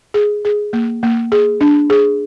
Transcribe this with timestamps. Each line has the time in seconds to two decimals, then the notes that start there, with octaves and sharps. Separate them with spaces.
0.14 G#4
0.45 G#4
0.73 A#3
1.03 A#3
1.32 G#4
1.61 D4
1.90 G#4